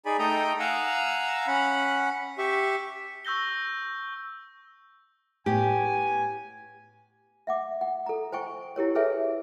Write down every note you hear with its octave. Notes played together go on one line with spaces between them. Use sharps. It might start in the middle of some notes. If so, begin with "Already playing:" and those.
D#4 G#4 D5 G#5 B5
A3 D#4 A4 G5 A#5 D#6
F5 F#5 G#5 A#5 E6
C#4 F#5 B5
G4 E5 C#6
C#6 E6 G6 A#6 G7
A2 B3 G4 G#5
E5 F#5 D6
F#5
A4 A#5
C5 G5 G#5 C#6
E4 G4 A#4 C#5
G#4 A4 B4 C#5 E5 G#5